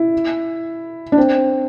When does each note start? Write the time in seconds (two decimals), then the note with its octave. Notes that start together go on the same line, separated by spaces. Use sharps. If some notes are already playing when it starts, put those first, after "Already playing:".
Already playing: E4
1.12 D4
1.18 C4